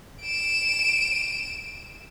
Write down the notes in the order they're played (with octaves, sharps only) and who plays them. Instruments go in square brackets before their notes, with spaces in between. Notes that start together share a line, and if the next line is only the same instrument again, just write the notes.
[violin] D7 E7